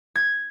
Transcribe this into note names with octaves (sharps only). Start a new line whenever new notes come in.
G#6